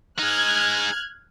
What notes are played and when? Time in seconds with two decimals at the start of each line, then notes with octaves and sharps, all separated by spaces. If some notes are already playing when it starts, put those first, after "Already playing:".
0.19 D#4 G#4 F6 F#6 G#6